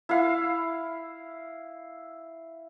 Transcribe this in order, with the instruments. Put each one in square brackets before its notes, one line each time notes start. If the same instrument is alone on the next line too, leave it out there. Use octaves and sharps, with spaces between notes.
[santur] E4 F5